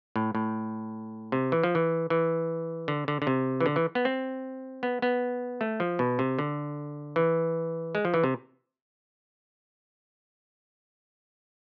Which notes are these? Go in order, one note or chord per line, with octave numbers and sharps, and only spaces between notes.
A2
A2
C3
E3
F3
E3
E3
D3
D3
D3
C3
E3
D3
E3
B3
C4
B3
B3
A3
F3
B2
C3
D3
E3
G#3
F3
E3
C3